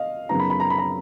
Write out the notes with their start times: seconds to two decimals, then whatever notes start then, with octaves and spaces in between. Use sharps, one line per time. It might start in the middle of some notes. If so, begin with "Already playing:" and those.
Already playing: D#5 F5
0.29 F#2 C#3 F#3 B3 D#4 A#5
0.40 B5
0.50 B5
0.60 A#5
0.70 B5
0.78 A#5